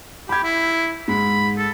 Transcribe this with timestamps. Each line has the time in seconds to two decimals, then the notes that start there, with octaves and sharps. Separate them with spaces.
0.29 G4 B5 G#6
0.43 E4
1.08 G#2 B5
1.58 A4